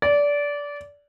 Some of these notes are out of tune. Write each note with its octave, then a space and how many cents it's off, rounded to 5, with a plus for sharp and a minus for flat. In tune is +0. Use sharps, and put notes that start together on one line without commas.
D5 -20